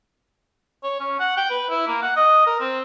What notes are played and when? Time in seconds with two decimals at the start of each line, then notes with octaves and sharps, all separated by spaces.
0.84 C#5
1.00 C#4
1.20 F#5
1.37 G5
1.50 B4
1.70 E4
1.88 A#3
2.02 F#5
2.16 D#5
2.47 A#4
2.60 C4